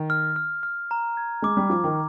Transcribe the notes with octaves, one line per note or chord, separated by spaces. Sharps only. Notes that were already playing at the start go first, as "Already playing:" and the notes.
Already playing: D#3
F6
F6
F6
A#5
G#6
G#3 D6
G3
F3 D6
D#3